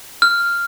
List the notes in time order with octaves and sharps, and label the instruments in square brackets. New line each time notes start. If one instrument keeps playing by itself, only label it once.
[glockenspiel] F6